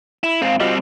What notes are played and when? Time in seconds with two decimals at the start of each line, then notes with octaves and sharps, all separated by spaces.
0.23 E4
0.42 G#2 C4 F5
0.60 G3 C4 F4 F#4 D#5